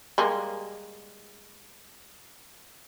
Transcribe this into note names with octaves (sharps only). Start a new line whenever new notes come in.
G3 G#3 A#3